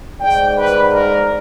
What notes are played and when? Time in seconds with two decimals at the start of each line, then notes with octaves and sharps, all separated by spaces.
0.20 G#2 D5 G5
0.57 B4
0.90 A#4